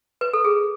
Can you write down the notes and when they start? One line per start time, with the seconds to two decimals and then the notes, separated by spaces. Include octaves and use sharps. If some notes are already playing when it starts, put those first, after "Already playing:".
0.21 B4
0.33 A4
0.45 G#4